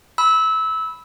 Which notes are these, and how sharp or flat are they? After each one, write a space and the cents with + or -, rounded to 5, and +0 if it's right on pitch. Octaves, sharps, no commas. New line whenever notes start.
B5 +0 E6 -20